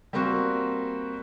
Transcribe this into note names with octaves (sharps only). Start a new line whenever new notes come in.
G3 A#3 C4 F#4